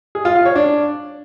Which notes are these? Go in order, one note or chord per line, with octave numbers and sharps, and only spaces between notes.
G#4
F4
F5
C#5
D4